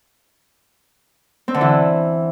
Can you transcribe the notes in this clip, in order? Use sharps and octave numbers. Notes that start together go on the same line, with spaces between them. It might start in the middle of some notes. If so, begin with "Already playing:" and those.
C4
D3
E3